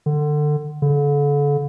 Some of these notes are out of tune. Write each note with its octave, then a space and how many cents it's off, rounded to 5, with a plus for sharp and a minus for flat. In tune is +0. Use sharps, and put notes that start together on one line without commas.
D3 +25
D3 -35